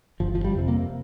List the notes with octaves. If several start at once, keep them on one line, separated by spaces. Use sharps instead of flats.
G1 F3
F3
G3
F2 C3
A#3